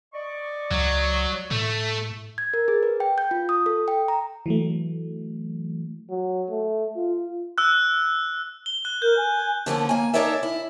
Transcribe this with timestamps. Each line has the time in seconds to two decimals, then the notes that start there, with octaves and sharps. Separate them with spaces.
0.13 D5 D#5 C#6
0.71 C#2 F#3
1.51 A2 A3
2.38 G#6
2.54 A#4
2.68 G#4
2.83 B4
3.00 G5
3.18 G6
3.31 F4
3.49 D#6
3.66 A4
3.88 G5
4.08 A#5
4.46 E3 F#3 A3
6.10 F#3
6.50 A3
6.96 F4
7.58 E6 F#6
8.66 G7
8.85 F#6
9.02 A#4 G6
9.17 G#5
9.66 D3 F3 A#3 C#4
9.89 A#3 G#5
10.14 D#4 A4 A#4 C#5 D5 E5
10.43 E4